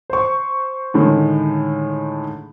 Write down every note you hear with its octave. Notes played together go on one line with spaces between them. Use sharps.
C5 C#6
A2 D3 D#3 G#3